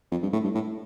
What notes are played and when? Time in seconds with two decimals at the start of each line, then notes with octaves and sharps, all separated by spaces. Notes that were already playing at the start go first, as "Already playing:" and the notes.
0.11 F2
0.23 G2
0.33 A2
0.44 G2
0.55 A2